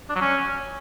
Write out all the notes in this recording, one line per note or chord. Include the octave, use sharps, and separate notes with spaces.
D4
F#3
C#4